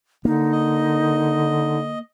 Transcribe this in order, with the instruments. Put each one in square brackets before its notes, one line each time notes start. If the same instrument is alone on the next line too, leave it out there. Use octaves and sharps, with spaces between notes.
[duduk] D3 [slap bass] A#3 [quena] D#4
[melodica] D#5